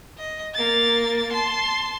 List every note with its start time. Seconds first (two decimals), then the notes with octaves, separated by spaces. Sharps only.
0.18 D#5
0.54 A#3 A6
1.33 A5 C6